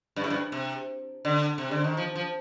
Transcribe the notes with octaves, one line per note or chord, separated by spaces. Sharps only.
G2
A2
G2
C3
D3
C3
D3
D#3
F3
F3